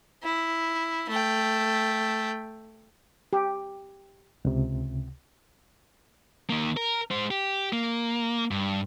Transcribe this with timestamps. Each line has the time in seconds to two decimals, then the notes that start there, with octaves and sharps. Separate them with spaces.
0.23 E4
1.09 A3 G5
3.33 G4
4.45 C#2 C3
6.50 D#3 A#3
6.77 A#4
7.11 G#3 C5
7.31 G4
7.73 A#3
8.51 G2